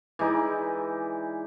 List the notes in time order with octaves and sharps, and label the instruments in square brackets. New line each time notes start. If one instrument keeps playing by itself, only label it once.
[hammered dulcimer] E3 G#3 D#4 D5